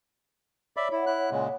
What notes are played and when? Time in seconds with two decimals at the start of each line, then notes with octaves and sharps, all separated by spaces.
0.77 C#5 D5 E5 B5
0.92 E4 C#5 F#5
1.07 E4 F#6
1.31 A#2 C#3 G#3